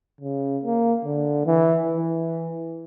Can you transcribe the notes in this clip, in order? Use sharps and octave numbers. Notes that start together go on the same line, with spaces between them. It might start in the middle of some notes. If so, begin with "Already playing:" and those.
C#3
A#3
D3
E3
E3